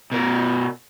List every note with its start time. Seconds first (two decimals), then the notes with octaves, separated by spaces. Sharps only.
0.12 B2 A#4